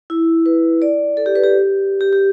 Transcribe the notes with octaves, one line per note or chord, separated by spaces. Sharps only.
E4
B4
D5
A4
G4
B4
G4
G4
G4